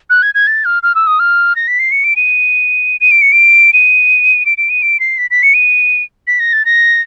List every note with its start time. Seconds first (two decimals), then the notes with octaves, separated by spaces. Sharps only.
0.10 F#6
0.22 G#6
0.34 G#6
0.47 A6
0.65 F6
0.83 F6
0.95 E6
1.07 D#6
1.19 F6
1.56 A#6
1.68 B6
1.79 C7
1.91 C#7
2.04 D7
2.16 D#7
3.00 D#7
3.11 D7
3.21 C#7
3.32 D7
3.73 D#7
4.46 D7
4.58 D7
4.69 D#7
4.82 D7
5.00 C7
5.18 B6
5.30 B6
5.43 C#7
5.54 D#7
6.27 B6
6.39 A#6
6.53 A6
6.65 A#6